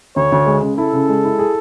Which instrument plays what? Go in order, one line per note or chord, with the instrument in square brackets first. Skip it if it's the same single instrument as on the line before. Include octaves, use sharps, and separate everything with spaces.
[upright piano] D2 [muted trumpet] C#5
[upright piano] D2
G#3
C#3
[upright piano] E4 [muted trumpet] A4
[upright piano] C#3
G#3
E4
G#4